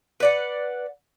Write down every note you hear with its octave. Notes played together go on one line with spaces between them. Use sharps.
B4 D5 F#5